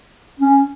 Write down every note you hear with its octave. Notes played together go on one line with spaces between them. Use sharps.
C#4